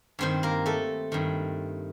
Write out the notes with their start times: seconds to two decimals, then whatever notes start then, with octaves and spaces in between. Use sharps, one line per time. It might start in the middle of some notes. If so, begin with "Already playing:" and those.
0.19 G2 D#3 C4 C5
0.43 A#3 A#4
0.66 A3 A4
1.12 G2 D#3